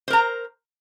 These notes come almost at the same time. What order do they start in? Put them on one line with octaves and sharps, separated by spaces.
C5 A#4 A#5